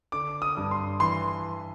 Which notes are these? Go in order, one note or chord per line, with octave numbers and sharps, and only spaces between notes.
D3 D6
D#6
G2
C6
E3 C6